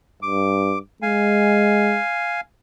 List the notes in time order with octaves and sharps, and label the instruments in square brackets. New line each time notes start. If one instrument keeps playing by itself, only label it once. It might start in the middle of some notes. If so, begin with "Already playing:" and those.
[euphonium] G2 [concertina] D6
[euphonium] G#3 [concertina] F5 G#5